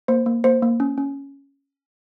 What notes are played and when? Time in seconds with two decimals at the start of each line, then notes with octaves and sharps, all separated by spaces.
0.08 A#3 C5
0.26 A#3
0.44 A#3 C5
0.62 A#3
0.80 C#4
0.98 C#4